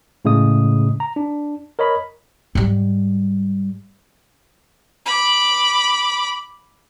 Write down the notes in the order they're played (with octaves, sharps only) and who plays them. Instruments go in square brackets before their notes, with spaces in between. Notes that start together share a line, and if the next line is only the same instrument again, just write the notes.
[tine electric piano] A2 C#3 G#3 A3 D#6
A#5
D4
A#4 C#5 D#5 B5
[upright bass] G#2 G3
[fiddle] B5 D6